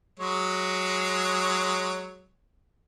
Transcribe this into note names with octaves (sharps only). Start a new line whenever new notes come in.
F#3 G#3 C#5